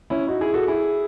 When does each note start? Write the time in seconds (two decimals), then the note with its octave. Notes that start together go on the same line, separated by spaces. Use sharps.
0.10 C#4 E4
0.27 D#4 F#4
0.41 E4 G#4
0.54 F#4 A4
0.68 E4 G#4